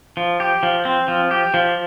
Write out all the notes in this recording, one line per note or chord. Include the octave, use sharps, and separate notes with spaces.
F3
G4
F3
C4
F3
G4
F3